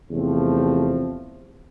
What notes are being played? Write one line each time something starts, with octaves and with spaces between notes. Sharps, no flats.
E2 C3 F3 A3 C4